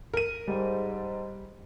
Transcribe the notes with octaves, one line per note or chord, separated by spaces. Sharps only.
A#4 D#7
G#2 G3